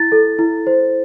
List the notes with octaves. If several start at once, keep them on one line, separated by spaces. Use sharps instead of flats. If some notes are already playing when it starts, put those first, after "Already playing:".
Already playing: E4 A6
A4
E4
C5